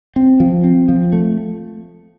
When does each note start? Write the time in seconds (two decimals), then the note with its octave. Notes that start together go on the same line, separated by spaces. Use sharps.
0.16 C4
0.40 F3
0.64 C4
0.89 F3
1.13 A3